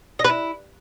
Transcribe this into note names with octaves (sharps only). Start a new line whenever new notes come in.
D#5
B4
E4